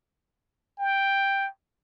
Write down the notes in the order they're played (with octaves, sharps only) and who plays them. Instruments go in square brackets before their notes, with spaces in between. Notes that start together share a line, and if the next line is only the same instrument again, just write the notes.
[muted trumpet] G5